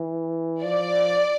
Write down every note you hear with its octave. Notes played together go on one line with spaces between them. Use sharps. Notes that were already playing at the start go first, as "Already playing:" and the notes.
Already playing: E3
F3 D5